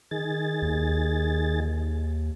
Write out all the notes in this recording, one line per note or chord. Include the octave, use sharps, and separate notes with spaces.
D#3 G#4 A6
D#2